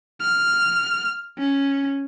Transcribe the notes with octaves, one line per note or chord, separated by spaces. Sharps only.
F6
C#4